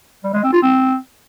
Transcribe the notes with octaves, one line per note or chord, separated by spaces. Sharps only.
G3
G#3
C4
F4
C4